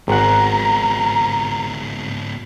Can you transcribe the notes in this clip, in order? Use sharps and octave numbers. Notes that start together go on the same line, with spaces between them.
G#1 G#2 B3 F#5 A#5